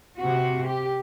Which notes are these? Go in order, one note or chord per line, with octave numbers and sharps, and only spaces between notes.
C3 F#4
G4